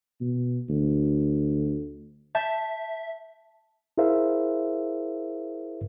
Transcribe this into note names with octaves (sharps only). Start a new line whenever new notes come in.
B2
D2
E5 A5 G6
E4 G#4 A#4 C5 E5 F5